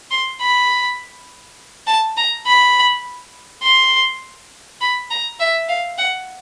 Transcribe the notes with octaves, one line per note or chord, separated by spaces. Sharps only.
C6
B5
A5
A#5
B5
C6
B5
A#5
E5
F5
F#5